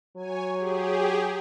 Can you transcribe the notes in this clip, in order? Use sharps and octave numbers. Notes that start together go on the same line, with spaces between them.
F#3 C#5 G#5
G4 G#4